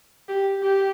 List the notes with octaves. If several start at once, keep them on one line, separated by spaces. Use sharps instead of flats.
G4
G4